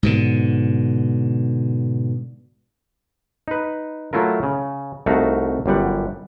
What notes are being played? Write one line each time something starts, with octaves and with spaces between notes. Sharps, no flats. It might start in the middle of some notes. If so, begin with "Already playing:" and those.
G#2 B2 D3
D#4 B4
F#3 A3 E4 F4 A#4
C#3
C2 A3 D#4 F#4 F5
G1 F#2 G3 F#5